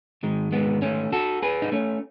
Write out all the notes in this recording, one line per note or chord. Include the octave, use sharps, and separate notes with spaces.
G#2 D#3 G#3
G#3 B3
A3 C#4
F#4 A4
G#4 B4
D#4
A3 C#4